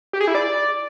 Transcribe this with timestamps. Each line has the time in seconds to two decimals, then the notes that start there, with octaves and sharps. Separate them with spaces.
0.13 G4
0.21 G#4
0.28 E4
0.35 D5